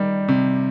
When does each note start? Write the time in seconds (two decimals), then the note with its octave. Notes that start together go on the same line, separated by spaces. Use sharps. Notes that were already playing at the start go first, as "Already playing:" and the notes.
Already playing: D#3 G3
0.28 C3